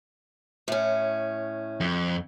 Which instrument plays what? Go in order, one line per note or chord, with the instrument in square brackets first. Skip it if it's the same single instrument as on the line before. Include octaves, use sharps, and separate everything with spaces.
[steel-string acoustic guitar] A2 C#4
[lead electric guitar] F2